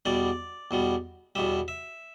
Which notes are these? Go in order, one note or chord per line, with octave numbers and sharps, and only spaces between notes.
E2 B2 G3 D5
E2 B2 G3
E2 B2 G3 E5
E5